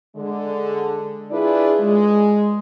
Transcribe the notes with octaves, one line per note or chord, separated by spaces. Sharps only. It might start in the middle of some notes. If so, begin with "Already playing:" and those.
D3 G#3
D4 E4 F4 G#4 B4 D5
G#3